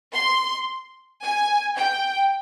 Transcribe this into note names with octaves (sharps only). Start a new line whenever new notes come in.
C6
G#5
G5